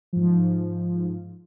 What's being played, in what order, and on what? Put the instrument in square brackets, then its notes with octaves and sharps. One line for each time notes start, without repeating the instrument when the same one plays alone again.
[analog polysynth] G#2 F3